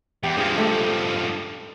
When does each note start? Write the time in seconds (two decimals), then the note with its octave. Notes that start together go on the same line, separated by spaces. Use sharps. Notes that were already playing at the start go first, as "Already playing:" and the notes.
0.23 E2 G4
0.37 G2 F3 G#4
0.58 A3 G4